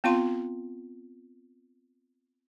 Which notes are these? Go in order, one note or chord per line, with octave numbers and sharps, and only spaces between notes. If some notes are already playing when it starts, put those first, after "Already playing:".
B3 C4 F4 F5 C6